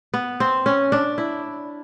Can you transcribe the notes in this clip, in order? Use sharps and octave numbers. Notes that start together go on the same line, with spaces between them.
B3
C4
C#4
D4
E4